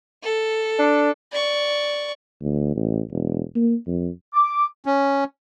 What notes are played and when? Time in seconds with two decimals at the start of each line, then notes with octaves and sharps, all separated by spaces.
0.23 A4
0.79 D4
1.32 D5 C#6
2.42 D2
2.76 A1
3.11 E1
3.55 A#3
3.87 F2
4.34 D6
4.86 C#4